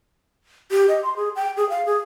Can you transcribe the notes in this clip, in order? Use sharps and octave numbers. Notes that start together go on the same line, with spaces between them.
G4
D#5
C6
G#4
G5
G#4
F5
G#4